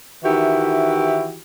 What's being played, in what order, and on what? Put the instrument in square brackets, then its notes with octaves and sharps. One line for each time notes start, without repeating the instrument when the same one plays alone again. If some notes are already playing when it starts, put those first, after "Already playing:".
[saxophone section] D#3 E3 E4 F#4 G4